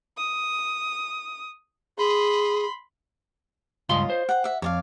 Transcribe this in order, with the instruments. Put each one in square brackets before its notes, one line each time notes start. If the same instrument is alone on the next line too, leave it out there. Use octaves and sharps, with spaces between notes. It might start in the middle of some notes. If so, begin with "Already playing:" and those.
[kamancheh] D#6
[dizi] G#4 [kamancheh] B5 C6
[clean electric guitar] C#2 G2 C6 [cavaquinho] F4 C#5 D#5
[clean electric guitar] C5
[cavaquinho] F#5 G5
E5 F#5
[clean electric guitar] F2 [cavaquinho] C#5 D5 F5